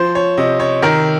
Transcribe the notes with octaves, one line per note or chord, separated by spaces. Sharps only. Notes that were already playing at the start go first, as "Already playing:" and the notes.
Already playing: F3 C5
C#5
C3 D#5
C#5
D#3 A#4